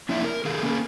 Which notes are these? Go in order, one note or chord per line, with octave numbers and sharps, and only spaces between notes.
F3 A#3 C#4 D4 E4 E5
A#4
D#3 G#4 A4 F5
A#3 C#4 A#4